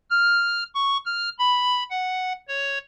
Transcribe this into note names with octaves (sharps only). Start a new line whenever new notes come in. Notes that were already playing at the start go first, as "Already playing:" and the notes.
F6
C#6
F6
B5
F#5
C#5